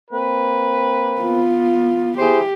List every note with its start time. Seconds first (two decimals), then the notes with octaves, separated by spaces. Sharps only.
0.11 A#3 C4 B4
1.21 B3 F4
2.18 E4 G4 G#4 C5